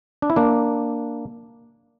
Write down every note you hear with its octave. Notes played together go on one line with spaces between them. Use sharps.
D4
E4
A#3 D4